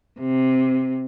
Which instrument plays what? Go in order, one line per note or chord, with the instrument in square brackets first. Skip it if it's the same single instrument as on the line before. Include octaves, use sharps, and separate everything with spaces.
[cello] C3